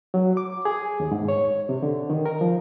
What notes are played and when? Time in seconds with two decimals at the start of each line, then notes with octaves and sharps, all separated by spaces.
0.14 F#3
0.37 D6
0.65 G#4
1.00 D#2
1.11 G#2
1.28 C#5
1.69 C3
1.83 D3
2.10 D#3
2.26 A#4
2.41 F3